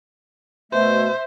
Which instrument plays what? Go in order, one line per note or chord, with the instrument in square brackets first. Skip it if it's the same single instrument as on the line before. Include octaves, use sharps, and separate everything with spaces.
[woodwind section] B2 A3 [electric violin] C5 [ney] E5